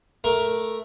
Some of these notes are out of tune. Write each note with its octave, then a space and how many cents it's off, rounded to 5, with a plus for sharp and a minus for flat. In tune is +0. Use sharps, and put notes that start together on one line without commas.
A3 +0 A#4 +10